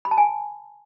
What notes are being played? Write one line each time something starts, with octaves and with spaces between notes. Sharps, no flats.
B5
A5
G#5